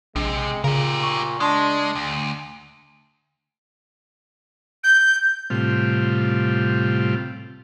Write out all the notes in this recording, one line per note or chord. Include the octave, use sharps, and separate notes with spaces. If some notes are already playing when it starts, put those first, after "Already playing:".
A#1 C3 G#3
A#2 C#3 G4 A#4
C#6
G#3 D4 A5 C6 D#6
D2
G6
A2 C3 G3 F4